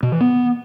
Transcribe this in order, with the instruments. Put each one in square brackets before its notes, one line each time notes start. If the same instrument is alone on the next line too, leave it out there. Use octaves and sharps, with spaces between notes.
[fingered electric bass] B2
E3
B3